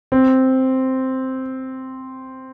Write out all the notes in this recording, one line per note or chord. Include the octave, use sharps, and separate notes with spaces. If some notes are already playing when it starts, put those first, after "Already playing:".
C4